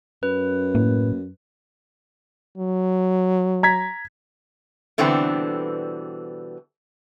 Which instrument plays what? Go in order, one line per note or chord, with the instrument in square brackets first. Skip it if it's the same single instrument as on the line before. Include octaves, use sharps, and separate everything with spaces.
[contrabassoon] F#2 [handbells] B4
[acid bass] A2 [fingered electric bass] A#3
[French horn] F#3
[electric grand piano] A#5 G#6 B6
[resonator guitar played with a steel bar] B2 D3 E3 G3 B3 C4